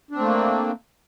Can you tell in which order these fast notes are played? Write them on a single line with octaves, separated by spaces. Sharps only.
D4 C4 A3 A#3